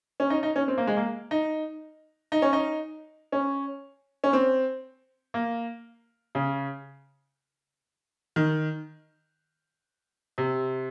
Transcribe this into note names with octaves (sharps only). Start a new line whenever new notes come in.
C#4
D#4
D#4
C#4
C4
A#3
G#3
A#3
D#4
D#4
C#4
D#4
C#4
C#4
C4
A#3
C#3
D#3
C3